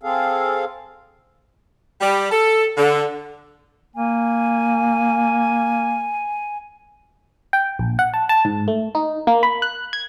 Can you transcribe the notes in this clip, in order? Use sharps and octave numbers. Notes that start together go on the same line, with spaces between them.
C4 G#4 A4 F5
G3
A4
D3
A#3 G#5
G5
A#1
F#5
A5
A5
G#2
A3
D#4
A#3
B5
F#6
G#6